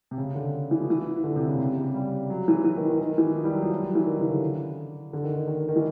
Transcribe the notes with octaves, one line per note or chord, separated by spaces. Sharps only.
C3
C#3
D3
E3
F3
E3
D3
C3
C#3
C3
C#3
G3
F#3
E3
E3
D#3
D#3
D#3
E3
F3
G3
F#3
F3
G3
F#3
E3
D#3
C#3
D3
D3
D#3
D#3
D#3
D#3
E3